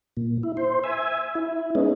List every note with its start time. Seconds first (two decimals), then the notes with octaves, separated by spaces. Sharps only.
0.17 A#2
0.43 E4
0.57 C5
0.84 E5 G#5
1.35 E4
1.75 G#3 B3 C#4 D#4